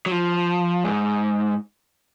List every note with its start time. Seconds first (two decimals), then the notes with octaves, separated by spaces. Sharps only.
0.06 F#3
0.11 F3
0.84 G#2